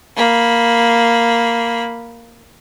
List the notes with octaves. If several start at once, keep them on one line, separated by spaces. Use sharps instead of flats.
A#3 B5